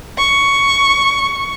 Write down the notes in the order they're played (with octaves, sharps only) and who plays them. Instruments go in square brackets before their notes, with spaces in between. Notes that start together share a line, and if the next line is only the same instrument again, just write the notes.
[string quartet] C#6